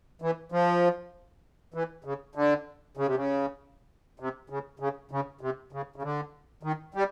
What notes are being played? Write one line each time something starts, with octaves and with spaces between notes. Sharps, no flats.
E3
F3
E3
C#3
D3
C#3
C3
C#3
C3
C#3
C#3
C#3
C3
C#3
C#3
D3
D#3
G3